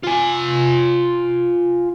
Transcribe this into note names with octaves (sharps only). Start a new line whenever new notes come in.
F4 G#5